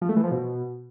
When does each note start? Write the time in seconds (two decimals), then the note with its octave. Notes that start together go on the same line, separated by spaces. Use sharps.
0.01 F3
0.09 A3
0.16 E3
0.24 F3
0.31 B2